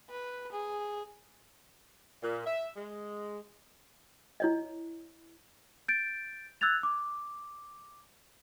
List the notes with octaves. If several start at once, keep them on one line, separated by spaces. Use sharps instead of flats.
B4
G#4
A#2
E5
G#3
E4 C#5 D#5
G6 A6 D7
E6 F#6 G#6 A6 F7
D6